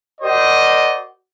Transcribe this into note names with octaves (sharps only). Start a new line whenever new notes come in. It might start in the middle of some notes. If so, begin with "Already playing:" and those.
F#4 A#4 C5 D5 D#5